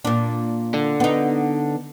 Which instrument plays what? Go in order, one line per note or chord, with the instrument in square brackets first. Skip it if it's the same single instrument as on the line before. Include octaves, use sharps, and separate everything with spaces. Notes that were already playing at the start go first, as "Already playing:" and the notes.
[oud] A#2 D4
[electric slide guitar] D3
[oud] B3 D#4